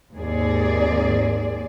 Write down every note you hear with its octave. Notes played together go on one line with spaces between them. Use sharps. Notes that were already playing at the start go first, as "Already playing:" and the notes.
D#2 G#2 C4 G#4 D5